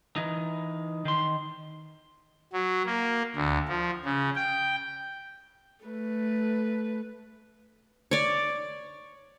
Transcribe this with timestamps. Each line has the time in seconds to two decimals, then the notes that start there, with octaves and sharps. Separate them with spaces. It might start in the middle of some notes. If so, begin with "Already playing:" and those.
0.16 E3 D#4
1.05 D#3 C6
2.52 F#3
2.86 A#3
3.36 D2
3.68 F3
4.05 C#3
4.36 G5
5.85 A3 B4
8.11 C#5 D5